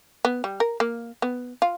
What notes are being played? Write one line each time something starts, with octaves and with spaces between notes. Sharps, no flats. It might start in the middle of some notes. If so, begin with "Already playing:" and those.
B3
G3
A#4
A#3
B3
F4